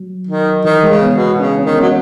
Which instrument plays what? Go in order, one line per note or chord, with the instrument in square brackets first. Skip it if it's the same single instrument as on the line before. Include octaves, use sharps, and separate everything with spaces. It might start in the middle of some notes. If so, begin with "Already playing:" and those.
Already playing: [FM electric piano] F#3
[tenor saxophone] D#3
[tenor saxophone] D#3 [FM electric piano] E3
[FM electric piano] G#3
[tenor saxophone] C#3
[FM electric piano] B3
[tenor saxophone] B2
[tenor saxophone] C#3 [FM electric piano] C#4
[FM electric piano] C#4
[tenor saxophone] D#3
[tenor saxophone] F#3 [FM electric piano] C#4